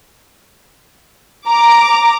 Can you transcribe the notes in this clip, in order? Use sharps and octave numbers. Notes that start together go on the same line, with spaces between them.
A#5 D6